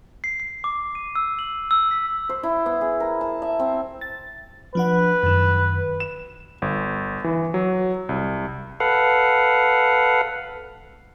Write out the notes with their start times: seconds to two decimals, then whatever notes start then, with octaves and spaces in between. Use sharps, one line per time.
0.24 C7
0.40 C7
0.64 D6
0.95 D#7
1.15 E6
1.39 F#7
1.71 E6
1.91 B6
2.29 C5
2.43 E4
2.66 B3
2.81 G#4
3.00 A#4
3.21 A5
3.42 E5
3.59 C4
4.01 A6
4.75 F3 D4 B4 F#5
5.23 F#2 D#3
6.00 E7
6.62 G1
7.24 E3
7.54 F#3
8.09 C2
8.80 A4 B4 F5 F#5